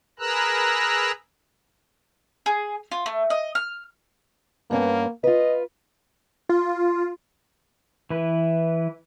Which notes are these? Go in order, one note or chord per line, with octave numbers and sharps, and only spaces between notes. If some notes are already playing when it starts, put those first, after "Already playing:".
G#4 A#4 B4 A#5 E6 F#6
G#4
F4
A3
D#5
F6
G2 A#3 B3 C#4
F4 B4 D#5
F4
E3 E4 B4